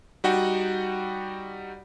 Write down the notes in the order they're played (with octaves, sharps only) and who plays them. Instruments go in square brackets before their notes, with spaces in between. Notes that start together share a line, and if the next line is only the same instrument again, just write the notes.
[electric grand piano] G3 D#4 F#4 F#5 G5